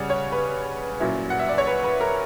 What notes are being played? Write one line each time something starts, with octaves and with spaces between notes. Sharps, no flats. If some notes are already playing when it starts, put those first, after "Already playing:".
Already playing: C#3 G3 C#4 D5 F#5
C#5
B4
A#2 F#3 C#4 E4
F#5
E5
D5
C#5
B4
B4
A#4